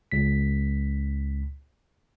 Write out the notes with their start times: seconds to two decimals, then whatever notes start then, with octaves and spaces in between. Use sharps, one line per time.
0.12 C#2 B6